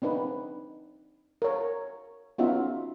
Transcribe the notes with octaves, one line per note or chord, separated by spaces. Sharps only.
C4 D4 D#4 B4
A#4 C#5
B3 C#4 D#4 F4 F#4 E5